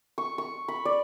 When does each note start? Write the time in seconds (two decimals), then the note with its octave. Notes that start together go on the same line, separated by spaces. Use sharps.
0.18 C#6
0.38 C#6
0.68 B5
0.85 D5